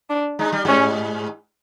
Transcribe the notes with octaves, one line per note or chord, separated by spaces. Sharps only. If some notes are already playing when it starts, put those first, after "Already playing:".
D4
G#3 D#4
G3
G#2 G#3 C#4